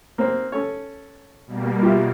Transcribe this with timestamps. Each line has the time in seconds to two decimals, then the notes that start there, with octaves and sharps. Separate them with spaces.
0.18 A#3 C4 C5
0.52 C#4 A4 C#5
1.47 B2 G3 A#3
1.83 F4 G4 E5